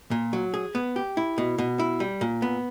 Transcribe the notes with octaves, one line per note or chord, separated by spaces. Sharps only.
A#2
F#3
G#4
B3
G4
E4
B2
B2
E4
G3
A#2
B3